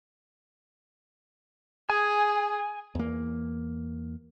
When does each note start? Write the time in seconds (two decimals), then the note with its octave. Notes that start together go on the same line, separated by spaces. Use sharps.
1.90 G#4 G#5
2.95 E2 A#3